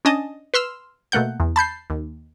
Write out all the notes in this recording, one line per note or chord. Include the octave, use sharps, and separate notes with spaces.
C#4 D4 D#5 G#5 A5
B4 C6 E6 F6
B2 A3 A#3 F#5 G6
E2
A5 B5 G6 C7
D#2